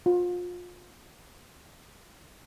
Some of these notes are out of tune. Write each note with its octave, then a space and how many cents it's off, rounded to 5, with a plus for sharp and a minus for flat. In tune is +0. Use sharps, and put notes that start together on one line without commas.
F4 +30